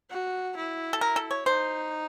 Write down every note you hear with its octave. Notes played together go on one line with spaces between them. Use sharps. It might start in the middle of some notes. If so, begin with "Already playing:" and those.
F#4
E4
A4
E4 A#4
A4
C#5
D#4 C5